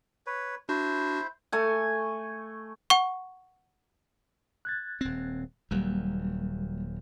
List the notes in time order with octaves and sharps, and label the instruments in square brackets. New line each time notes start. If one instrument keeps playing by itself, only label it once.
[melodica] B4 C#5
[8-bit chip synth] D4 F#4 [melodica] E4 C5
[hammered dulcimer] A3 G#5
[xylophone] F#5 C#6
[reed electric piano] F#6 G#6 A6
[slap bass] D#1 C4
[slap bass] D#1 D#2 F#3 [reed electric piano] G3 A#3